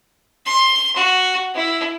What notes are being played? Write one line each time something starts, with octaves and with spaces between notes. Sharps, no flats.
C6
F#4
E4